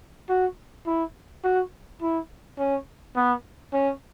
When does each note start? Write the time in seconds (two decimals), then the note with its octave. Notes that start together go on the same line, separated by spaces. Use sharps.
0.29 F#4
0.87 E4
1.44 F#4
2.02 E4
2.59 C#4
3.16 B3
3.73 C#4